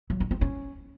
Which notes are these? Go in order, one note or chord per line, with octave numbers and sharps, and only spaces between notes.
F#3
D4
C4
C#4